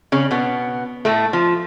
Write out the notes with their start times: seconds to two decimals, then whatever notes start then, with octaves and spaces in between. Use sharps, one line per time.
0.12 C#3 C#4
0.31 B2 B3
1.05 A2 A3
1.33 F3